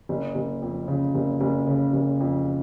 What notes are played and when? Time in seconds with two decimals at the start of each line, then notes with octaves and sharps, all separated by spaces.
0.09 F#1
0.35 F#1
0.62 F2
0.88 C#3
1.15 F#1
1.41 F#1
1.67 C#3
1.93 F#1
2.20 F2